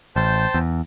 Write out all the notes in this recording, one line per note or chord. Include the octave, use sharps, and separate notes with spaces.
A1 C5 G5 A5
E2